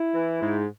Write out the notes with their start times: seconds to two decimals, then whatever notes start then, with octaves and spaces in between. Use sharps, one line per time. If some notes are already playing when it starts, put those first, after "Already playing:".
Already playing: E4
0.14 E3
0.41 G#2